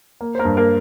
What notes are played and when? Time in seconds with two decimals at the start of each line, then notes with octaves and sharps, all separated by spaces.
0.21 A#3
0.35 C5
0.39 A#3 A#4
0.45 G2
0.57 A#3 A#4